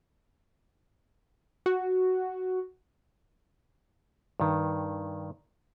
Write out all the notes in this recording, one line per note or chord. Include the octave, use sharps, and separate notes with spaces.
F#4
G2 D#3